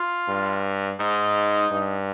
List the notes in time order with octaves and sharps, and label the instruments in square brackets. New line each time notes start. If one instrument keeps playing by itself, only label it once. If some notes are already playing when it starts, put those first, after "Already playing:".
Already playing: [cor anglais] F4
[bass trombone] G2
[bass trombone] G#2 [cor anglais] D#4
[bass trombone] G2